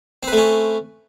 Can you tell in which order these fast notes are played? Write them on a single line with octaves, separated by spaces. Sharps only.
C4 B4 A3 C#4